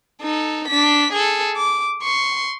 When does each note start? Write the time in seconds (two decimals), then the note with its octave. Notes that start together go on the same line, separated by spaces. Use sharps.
0.22 D#4 A4
0.68 D4 B6
1.13 G#4 A4
1.56 D6
2.02 C6 C#6